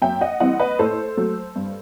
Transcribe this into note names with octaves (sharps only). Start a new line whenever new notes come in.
F#2 E5 G5
D#5 F#5
E3 G3 C4 D#5 F#5
B4 D#5
A2 A4 C5
F#3 A3
G2